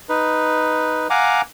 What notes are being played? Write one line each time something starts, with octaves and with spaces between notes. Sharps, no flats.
D#4 B4
F5 F#5 G#5 A#5 D6